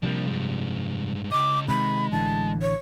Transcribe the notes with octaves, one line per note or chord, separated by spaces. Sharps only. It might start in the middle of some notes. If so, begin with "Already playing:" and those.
C3 F3 G3 A#3 D4
G2 G#3
C#3 D#5 D6
C3 D#3 G#3 B5
A1 D3 E3 A5
C#5